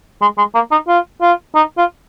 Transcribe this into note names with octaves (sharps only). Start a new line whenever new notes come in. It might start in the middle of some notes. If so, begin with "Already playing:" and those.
G#3
G#3
A#3
D#4
F4
F4
D#4
F4